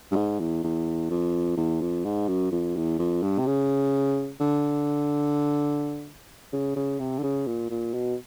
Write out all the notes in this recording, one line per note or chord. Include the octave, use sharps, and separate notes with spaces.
G2
G#2
E2
E2
F2
E2
F2
G#2
F#2
F2
E2
F2
G2
C3
C#3
D3
C#3
C#3
C3
D3
C#3
A#2
A#2
B2